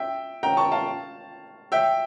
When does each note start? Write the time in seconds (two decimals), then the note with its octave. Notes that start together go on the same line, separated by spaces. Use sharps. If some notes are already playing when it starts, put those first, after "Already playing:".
Already playing: E5 G5
0.43 G5 A#5
0.57 A5 C#6
0.71 F5 A5
1.72 E5 G5